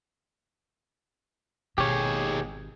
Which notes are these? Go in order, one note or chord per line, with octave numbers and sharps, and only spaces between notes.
G#1 D#2 B2 G#3 G4 C#5